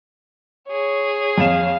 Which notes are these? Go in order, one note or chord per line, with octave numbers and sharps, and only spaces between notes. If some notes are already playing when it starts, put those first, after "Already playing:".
G#4 C#5
F2 F5 E7